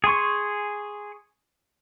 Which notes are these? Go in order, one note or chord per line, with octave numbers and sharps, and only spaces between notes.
G#4 G#5 C6 C#6